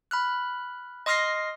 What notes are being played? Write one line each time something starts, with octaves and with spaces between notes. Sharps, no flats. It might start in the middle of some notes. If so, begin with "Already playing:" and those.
B5 F6 F#6
D#5 C6 D#6 F6 A#6 C7